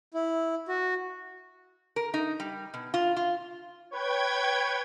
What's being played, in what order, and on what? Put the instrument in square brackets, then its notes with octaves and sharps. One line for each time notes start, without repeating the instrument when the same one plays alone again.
[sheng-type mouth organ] E4
F#4
[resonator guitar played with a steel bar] A#4
D#4
G3
B2
F4
F4
[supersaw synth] B4 C#5 [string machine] G5 G#6